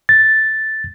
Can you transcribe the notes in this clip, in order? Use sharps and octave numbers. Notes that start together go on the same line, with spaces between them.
A6